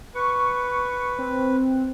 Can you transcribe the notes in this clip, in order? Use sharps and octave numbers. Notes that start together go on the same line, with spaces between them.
B4 C#6
C4